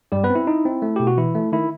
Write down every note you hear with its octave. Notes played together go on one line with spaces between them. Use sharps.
G2 G3 G4
B3 B4
C4
E4
D#4
C4
A3
B2 G4
F#4
E3 E4
A3
D#3 E4